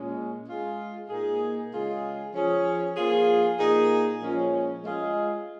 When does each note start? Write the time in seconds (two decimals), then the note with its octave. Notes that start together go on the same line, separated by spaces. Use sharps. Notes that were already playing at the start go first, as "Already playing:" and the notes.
Already playing: A#2 G#3 C#4
0.47 G#3 F4 G#4
1.09 A#2 A#3 D#4 G#4
1.71 C#3 G#3 F4 G#4
2.33 F3 C#4 G#4
2.97 F3 A#3 F4 G#4
3.58 A#2 A#3 D#4 G#4
4.21 A#2 F3 G#3 C#4
4.83 G#3 F4 G#4